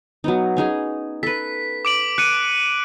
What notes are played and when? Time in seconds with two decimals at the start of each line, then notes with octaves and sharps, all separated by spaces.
0.24 F#3 B3 D#4
0.57 C#4 D#4 G#4
1.23 A4 B4 B6
1.85 D6 D7 F#7
2.18 A5 F#6 C#7 D#7